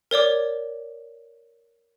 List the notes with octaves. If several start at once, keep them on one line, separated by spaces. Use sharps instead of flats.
A#4 C#5 D5 D6